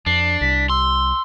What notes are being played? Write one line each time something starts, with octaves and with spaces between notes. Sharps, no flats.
F2 D4 C7
C2 G3 B6
C6 E6